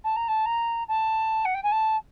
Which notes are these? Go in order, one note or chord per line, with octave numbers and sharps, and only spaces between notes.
A5
A#5
A5
A#5
A5
F#5
G5
G#5
A5